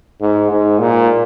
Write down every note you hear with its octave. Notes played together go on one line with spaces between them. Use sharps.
G#2
G#2
A#2